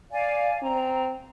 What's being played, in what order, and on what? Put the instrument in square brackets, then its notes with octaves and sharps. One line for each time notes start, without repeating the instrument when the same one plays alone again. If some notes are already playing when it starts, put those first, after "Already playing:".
[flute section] D5 F5 G#5
[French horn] C4 [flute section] A#5